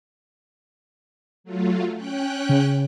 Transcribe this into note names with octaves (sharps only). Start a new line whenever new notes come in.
F#3 A3 F4
C#4 G5 F#6
C#3